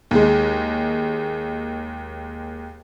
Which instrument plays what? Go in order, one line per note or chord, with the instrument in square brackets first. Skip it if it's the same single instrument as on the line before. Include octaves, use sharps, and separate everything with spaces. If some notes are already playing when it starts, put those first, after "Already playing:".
[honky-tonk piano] D#2 G#3